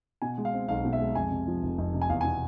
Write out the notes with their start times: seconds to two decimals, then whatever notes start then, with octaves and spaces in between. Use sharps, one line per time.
0.22 B2 G#5
0.38 G#3
0.45 F5
0.54 C4
0.68 B1 F5
0.85 B2
0.93 E5
1.01 G#3
1.15 F2 G#5
1.31 C3
1.47 F3
1.63 F1
1.78 F2
1.93 C3
2.02 G#5
2.09 E2 F5
2.21 G#5
2.24 B2